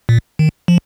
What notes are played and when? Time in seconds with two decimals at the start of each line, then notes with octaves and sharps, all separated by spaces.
0.09 A#2
0.39 D#3
0.68 F3